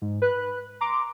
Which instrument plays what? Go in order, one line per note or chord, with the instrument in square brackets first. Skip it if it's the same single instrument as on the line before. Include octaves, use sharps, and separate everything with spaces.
[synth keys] G#2
B4 F#6
A#5 C6 D6